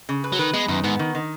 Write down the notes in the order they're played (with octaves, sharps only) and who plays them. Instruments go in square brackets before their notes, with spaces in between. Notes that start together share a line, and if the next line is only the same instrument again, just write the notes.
[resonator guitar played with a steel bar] C#3
B4
[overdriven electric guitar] F#3
[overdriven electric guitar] D#3 [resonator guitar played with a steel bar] B4
[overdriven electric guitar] G#3 [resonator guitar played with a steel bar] B3
[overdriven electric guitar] F#2 [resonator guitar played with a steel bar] D#3
[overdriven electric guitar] G#2 [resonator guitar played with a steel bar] B3
[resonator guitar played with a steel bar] D#3
D#3